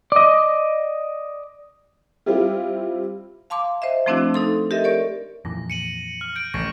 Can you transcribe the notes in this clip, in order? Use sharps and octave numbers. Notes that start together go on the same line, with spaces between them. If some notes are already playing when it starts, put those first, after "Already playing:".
D5 D#5
G3 C4 E4 F4 G4
F5 A5 C6 D6
C5 D#5 E5
F3 A3 C4 D4 E4 F#4
D#4 A4 C6
G4 A4 A#4 D#5 E5
A#4 C#5 D5 C#6
F2 A#2 E3 A#6
C#7 D#7 F#7
F6
G6 D7
A1 C#6 A#6 D7